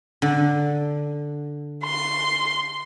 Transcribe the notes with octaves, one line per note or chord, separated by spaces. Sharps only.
D3
C6